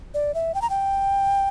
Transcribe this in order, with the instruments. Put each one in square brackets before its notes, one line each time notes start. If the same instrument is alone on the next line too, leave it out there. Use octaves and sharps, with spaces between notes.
[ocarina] D5
E5
G5
A#5
G5